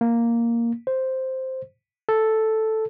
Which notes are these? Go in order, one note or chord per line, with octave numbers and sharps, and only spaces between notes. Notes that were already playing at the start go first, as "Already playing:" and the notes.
A#3
C5
A4